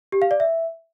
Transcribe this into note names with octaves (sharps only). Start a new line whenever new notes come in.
G4
F5
D5
E5